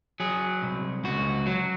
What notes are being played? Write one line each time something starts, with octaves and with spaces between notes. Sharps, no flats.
F#3 G#4
C2
C#2 F#4
F#3